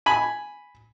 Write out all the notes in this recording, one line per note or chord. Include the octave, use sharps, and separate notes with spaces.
G#5 B5